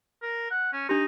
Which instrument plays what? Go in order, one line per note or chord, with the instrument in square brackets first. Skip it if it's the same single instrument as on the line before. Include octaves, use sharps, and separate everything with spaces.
[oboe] A#4
F#5
C#4
[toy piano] D4 G4 [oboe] D#4